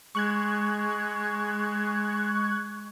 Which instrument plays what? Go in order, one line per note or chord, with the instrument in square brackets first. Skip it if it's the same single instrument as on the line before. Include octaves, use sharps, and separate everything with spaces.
[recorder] G#3 [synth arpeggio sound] C#6 F#6 G#6